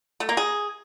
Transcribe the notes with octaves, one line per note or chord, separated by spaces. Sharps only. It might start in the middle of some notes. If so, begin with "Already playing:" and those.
A3
A#3
G#4